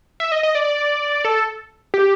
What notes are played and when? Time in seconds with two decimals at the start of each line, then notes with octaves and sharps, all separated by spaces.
0.20 E5
0.32 D#5
0.43 D#5
0.55 D5
1.25 A4
1.94 G4